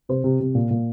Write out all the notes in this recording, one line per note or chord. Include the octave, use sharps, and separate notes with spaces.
C3 C5
C3
C3
A#2
A#2